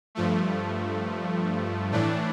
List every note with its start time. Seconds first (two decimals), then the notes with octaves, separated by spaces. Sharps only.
0.15 G2 F3 A3
1.92 A2 E3 A3 D4